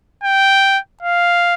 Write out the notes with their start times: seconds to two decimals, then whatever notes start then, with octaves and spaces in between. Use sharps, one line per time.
0.23 G5
1.02 F5